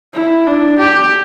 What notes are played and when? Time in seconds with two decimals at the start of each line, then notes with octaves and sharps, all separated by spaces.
0.14 E4
0.47 D4
0.78 G4